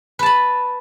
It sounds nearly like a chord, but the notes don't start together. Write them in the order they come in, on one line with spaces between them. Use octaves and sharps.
B4 A5 B5